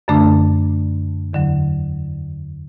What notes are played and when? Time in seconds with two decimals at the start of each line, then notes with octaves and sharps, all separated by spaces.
0.08 F#2 D3 A3 D4
1.33 E2 D3 F#3